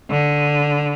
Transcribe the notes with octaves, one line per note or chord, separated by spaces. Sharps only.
D3